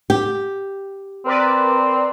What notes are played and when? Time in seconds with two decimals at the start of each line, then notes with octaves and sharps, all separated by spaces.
0.10 G4
1.26 C4 A#4 B4 D5